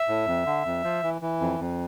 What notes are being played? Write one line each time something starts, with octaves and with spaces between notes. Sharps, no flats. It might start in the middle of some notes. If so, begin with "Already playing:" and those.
Already playing: E5
A2
F2
D3
F2
F3
E3
E3
F2
F2